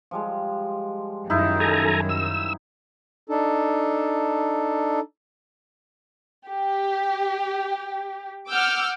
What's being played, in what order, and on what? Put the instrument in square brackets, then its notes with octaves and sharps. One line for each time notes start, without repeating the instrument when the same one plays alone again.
[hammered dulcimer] F3 G3 G#3
[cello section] F#2 D#3 [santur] D#4 E4
[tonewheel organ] A4 G#5 A#5
E6
[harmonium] D4 D#4 A4
[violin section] G4
F#5 D6 E6 F6 G6